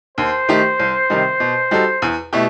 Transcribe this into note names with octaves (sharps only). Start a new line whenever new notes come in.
D#2 C5
D#3 A3 D#4 G4
C2
C3 D#3 G3 D#4
B2
G3 D#4 F#4 A4
E2
B2 A3 E4 G4